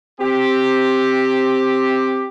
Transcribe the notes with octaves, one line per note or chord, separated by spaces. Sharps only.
C4 G4